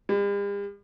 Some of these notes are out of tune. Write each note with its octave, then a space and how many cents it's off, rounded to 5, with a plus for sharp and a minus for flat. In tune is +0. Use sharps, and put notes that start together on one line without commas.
G3 +45